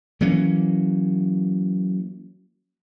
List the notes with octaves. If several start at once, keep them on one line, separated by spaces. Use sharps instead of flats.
E3 F#3 A#3 C#4